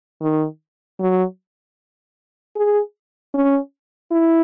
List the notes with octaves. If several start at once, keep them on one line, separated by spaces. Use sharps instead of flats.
D#3
F#3
G#4
C#4
E4